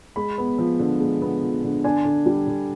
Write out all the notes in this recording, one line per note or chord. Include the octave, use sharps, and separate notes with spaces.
G#3 B5
B3
F3
D3
G#3
B3
F3
D3
D4 G#5
D3
G3
D3